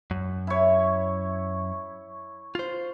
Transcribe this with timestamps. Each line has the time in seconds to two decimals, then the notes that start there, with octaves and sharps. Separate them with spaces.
0.11 F#2
0.47 E4 C#5
2.55 F4 C5